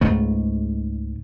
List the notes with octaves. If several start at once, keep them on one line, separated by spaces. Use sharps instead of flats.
C#2 G#2 A3